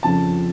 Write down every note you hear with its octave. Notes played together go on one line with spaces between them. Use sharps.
F2 C#3 F3 A5